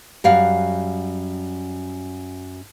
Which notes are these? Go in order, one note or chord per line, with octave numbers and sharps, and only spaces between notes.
F#2 G3 F5 F#5